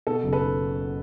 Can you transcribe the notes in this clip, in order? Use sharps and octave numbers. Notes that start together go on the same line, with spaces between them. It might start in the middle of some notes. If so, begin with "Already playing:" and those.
B2 A4
F#1
A4 B4